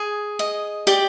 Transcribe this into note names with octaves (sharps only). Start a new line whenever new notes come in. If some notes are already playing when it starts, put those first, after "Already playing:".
Already playing: G#4
D#5
G4 D5 G5